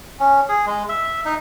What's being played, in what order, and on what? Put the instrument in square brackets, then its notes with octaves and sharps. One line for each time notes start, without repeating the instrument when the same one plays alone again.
[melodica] C#4
G#4
G#3
E5
D#4